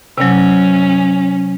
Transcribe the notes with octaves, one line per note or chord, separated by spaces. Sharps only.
C3 F#3 C#4